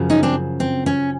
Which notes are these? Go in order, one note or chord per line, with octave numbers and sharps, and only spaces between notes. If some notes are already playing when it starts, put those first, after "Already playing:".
Already playing: F#2 C#3 F3
C#4 D#4
C4 D4
C4
C#4